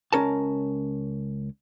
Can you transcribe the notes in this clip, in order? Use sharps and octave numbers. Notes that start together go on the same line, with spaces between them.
C#2 F#2 C#4 A#4 A5